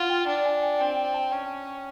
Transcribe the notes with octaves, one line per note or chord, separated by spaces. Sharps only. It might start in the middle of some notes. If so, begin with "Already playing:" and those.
Already playing: F4 F5 F#5
G5
D4 G5
G#5
G5
C4 G5
G5
A5
C#4 G5